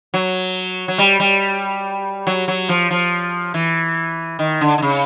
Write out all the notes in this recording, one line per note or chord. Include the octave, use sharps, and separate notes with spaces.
F#3
F#3
G3
G3
F#3
F#3
F3
F3
E3
D#3
D3
D3
C#3